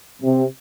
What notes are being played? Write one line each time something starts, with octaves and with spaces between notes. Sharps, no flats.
C3